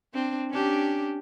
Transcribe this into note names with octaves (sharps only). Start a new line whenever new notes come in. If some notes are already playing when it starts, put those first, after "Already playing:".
C4 D4
C#4 D4 G4